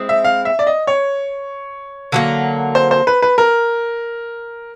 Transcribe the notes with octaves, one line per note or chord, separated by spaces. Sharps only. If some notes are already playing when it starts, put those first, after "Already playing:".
Already playing: G#3 C4 E4
E5
F5
E5
D5
D#5
C#5
D3 F#3 A#3
C5
C5
B4
B4
A#4